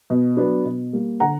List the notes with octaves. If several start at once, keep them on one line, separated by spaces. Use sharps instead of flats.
B2
F#3 B3 D4
B2
G3 A#3
D3 F#5 A#5